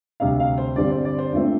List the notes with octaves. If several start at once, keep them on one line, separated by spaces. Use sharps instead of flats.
D2 C3 G3 F5
F5
C5
G2 D3 G3 C4 D5
C5
D5
C5
G2 F3 A3 C4